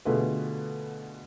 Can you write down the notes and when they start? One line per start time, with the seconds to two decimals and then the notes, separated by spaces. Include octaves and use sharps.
0.05 B2 D3 A3 F4 G#4 B4